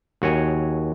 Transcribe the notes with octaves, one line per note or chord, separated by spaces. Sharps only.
D#2 F#4 C#5 G#5